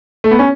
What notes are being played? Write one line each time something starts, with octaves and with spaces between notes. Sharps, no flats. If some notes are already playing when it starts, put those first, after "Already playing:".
A3
B3
C#4